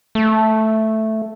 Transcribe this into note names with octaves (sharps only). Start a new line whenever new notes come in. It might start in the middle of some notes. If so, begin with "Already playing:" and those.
A3